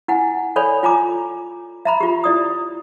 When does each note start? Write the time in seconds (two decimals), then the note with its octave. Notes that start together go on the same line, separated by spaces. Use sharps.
0.08 E4 F#5 G#5
0.56 A4 C#5 D5 G#5 B5
0.83 F4 G#5 A#5 D6
1.85 E5 A#5 B5
2.01 F4 G4
2.24 E4 D5 D#6